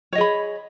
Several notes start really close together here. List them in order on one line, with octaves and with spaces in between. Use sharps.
C#5 D#5 G#4 B5